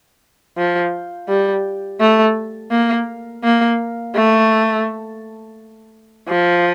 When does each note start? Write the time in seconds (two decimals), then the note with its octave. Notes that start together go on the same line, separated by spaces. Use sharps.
0.57 F3
1.29 G3
2.00 A3
2.71 A#3
3.44 A#3
4.15 A3
6.29 F3